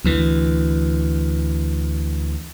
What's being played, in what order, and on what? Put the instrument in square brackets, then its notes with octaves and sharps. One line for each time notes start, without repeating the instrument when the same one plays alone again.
[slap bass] D2 E3